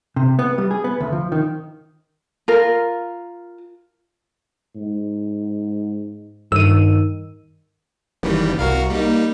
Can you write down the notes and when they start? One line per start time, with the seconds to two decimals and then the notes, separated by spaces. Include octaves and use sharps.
0.16 C3
0.39 B3
0.58 G3
0.71 G#4
0.84 B3
1.00 D2
1.12 F3
1.32 D#3
2.48 F4 A#4
4.75 G#2
6.52 G2 D#3 E6 D#7
8.23 F#1 D#3 E3 G3
8.59 C2 F#4 A#4 F5
8.90 G3 A#3 D#4